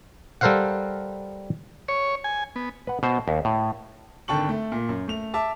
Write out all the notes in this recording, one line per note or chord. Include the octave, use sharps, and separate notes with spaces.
G3 A4 A#4 C5 F5 F#5
C#5
G#5
B3
B4 F#5
B2 C5
D#2
A2
G#1 D3 G5 A5 C#6 F#7
A3
A#2
F#2
A3 F7
E5 A5 D6